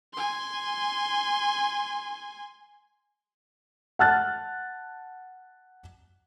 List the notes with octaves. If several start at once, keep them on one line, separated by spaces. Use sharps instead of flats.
G#5 C6
F#5 A5 F6 F#6 A6